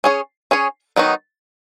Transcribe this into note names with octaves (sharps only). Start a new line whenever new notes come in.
C#4 G#4 C#5
C#4 G#4 C#5
D#3 F#3 B3 D#4